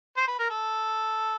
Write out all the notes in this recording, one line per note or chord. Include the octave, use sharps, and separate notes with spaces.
C5
B4
A#4
A4